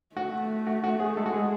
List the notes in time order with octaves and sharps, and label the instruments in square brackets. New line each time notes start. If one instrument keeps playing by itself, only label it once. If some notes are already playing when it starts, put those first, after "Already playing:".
[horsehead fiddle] A3 [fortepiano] F#4
[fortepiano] F#4
F#4
G#4
[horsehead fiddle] G#3 [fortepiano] A4
[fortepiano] F#4
G#4